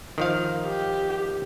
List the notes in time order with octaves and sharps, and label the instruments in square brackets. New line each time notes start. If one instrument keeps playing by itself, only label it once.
[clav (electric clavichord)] D#3 F3 F5
[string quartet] G4